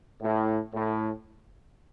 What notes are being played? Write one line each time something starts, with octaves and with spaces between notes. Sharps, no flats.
A2
A2